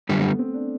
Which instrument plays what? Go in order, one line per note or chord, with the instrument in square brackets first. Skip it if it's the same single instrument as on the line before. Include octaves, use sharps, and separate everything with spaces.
[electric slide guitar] F#2 D3 G3
[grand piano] A3
B3
C4
D4